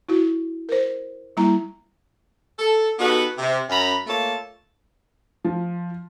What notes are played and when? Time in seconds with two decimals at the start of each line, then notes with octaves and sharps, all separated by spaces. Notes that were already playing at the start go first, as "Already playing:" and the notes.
0.09 E4 F#4
0.69 A#4 C5
1.37 G3 A#3 E4 A#5
2.59 A4
2.99 B3 D#4 F#4 G4 A4 B4
3.38 C3
3.70 F#2 A#5 B5
4.07 A3 A#3 F4 A4 C#5 A5
5.45 F3